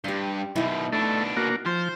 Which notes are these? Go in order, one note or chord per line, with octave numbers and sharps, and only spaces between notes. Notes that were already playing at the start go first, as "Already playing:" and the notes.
G2 G4 C6
F#2 B2 D#4 E4
B2 A3 D4
A#3 F#4
F3 C5